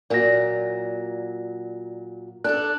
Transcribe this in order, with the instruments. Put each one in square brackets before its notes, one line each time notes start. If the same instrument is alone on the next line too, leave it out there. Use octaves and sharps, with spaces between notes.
[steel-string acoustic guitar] A#2 F#3 [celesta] D5 A#6
[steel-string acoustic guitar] D4 A4 [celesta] F#6